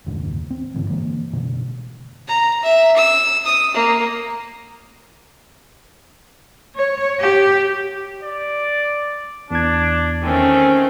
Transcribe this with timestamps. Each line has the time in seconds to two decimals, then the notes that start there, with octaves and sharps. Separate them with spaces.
0.06 F#1 D#2 G#2 D3
0.50 C4
0.74 G1 G#2 D3 E3
0.90 D3 E3 G#3 A#3
1.33 F#1 B2 D3 G#3
2.28 A#5
2.63 E5
2.97 E6
3.45 D#6
3.74 A#3
6.76 C#5
7.20 G4
8.24 D5
9.51 E2 D4 G#6
10.23 D#3 A3 C4 C#4